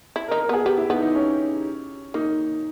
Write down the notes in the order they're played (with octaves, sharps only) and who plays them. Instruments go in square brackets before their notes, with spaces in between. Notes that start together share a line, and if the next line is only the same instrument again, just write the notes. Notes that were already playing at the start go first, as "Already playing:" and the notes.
[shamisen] E4
[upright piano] A#4
[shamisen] D#4
[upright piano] A#4
[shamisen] B3 [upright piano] G#4
[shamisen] B3 [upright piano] G4
[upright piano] E4
[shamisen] B3 [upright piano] D#4
[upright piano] D#4
C#4
[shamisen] A#3 [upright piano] D#4